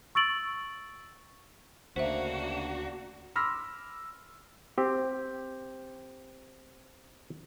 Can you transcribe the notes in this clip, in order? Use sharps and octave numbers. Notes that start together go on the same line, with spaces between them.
C#6 E6 A6 D7 F#7
D2 C#3 A#3 D4 F#4 C5 E5
B5 C6 D6 E6 F6 A#6
C4 G4